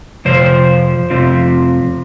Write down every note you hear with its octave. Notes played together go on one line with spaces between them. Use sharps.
F2 C3 F3 C5
F2 C3 F3